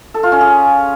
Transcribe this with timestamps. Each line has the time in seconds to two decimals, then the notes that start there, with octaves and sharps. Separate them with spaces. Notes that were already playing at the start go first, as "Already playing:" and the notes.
0.14 A4
0.23 F4
0.32 C#4
0.41 G#4